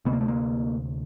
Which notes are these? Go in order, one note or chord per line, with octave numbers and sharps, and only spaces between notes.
D2 C3 B3
A#3
A3
A#3